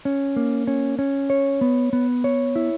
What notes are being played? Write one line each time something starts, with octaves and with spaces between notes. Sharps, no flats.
C#4
A#3
C#4
C#4
C#5
B3
B3
C#5
E4